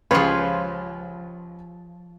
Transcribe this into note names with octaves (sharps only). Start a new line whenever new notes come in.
C#2 F3 F4 G4 G#4 B4 C#5 B5